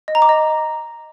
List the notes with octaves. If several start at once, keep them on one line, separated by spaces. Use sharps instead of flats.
D#5
A#5
D6
D#5